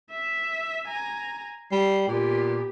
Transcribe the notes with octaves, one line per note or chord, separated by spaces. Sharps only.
E5
G#5 A#5
G3 C7
A#2 B3 G4